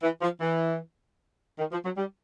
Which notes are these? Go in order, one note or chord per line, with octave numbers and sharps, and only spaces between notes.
E3
F3
E3
D#3
F3
F#3
G3